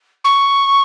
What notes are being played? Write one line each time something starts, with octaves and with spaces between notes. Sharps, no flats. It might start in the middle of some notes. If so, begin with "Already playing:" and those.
C#6